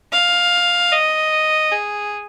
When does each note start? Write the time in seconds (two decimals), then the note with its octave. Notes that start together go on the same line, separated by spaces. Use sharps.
0.13 F5
0.92 D#5
1.72 G#4